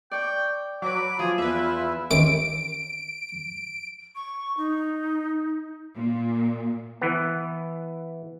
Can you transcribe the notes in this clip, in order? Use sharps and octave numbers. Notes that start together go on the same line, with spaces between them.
D5 G5 C#6
F#3 B4 D6
F3 F4 G#4
E2 E4 B4 E5
C3 D#3 C#4 D7
C#6
D#4
A#2
E3 B3